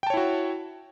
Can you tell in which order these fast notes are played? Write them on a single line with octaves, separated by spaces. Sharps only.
G5 A5 C#5 E4 F#4